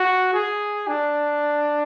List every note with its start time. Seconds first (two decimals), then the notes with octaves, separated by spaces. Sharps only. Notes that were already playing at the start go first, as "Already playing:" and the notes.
Already playing: F#4
0.33 G#4
0.88 D4